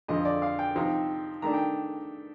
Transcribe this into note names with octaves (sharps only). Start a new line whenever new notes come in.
F2 D3 F3 D#5
D5
F5
G5
C3 F3 C4 D#4
D#3 A3 D4 A#5
G5